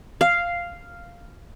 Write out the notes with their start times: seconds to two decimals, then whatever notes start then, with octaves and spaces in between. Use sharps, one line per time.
0.21 F5